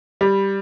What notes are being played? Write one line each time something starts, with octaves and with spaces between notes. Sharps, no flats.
G3